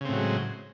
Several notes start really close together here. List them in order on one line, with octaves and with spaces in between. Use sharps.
C#3 C4 A2 F#3 G#3